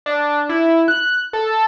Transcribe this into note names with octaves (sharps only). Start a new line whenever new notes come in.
D4
E4
F#6
A4